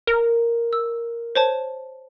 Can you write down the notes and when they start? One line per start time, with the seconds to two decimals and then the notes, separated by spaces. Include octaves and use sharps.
0.07 A#4
0.73 E6
1.35 C5 C#5 A5